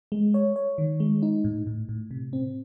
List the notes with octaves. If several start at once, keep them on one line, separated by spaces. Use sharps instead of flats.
G#3
C#5
C#5
D#3
G#3
D#4
A2
A2
A2
C3
C4